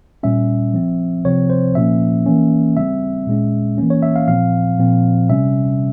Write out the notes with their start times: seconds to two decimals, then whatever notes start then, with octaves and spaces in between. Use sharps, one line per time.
0.23 A#2 G3 C#4 E5
0.74 F3 C4
1.25 C3 F3 C4 C#5
1.50 C5
1.75 A#2 F3 A#3 C#4 E5
2.26 E3 A#3 C#4
2.77 C#3 G3 C4 E5
3.27 A#2 G#3 C#4
3.78 E3 A#3 C#4
3.90 C#5
4.03 E5
4.16 F5
4.28 A#2 F3 C4 F5
4.79 A#2 F3 C4
5.30 C3 G3 C#4 E5